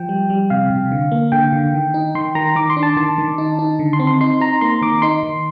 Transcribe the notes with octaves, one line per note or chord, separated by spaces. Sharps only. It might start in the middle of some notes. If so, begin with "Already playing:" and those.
Already playing: F3 G5
G3
G3
C3 F5
C3
D3
A#3
D3 G5
D3
D#3
D#4
D#3 C6
D#3 A#5
D#3 D6
C6
D4
A5
D#3 A5
D#3
D#4
D#4
D3
C6
C4
C6
D#4 C6
D#4 A#5
A#3 C6
D#3 D6
D#4 C6
D#3